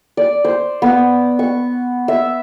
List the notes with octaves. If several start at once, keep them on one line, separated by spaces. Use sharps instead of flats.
D5
C5
B3
C#6
E5